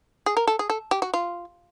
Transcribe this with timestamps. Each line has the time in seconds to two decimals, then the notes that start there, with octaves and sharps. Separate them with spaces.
0.26 G#4
0.37 A#4
0.47 A4
0.59 G#4
0.70 A4
0.91 G4
1.02 F#4
1.14 F4